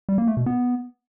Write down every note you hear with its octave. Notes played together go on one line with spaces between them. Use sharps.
G3
A#3
A3
B2
B3